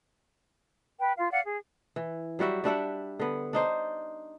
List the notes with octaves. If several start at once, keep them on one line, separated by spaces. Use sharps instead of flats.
B4 G5
F4 F5
D5 F5 F#5
G#4
E3
F#3 G3 F#4 E5
G3 D4 E5 F#5
D3 B3
D4 D#4 C5